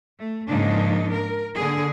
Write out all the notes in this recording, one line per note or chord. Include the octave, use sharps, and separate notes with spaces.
A3
G#2 C#3 F3 A#3 D4 D#4
A#4
D3 A#3 G#4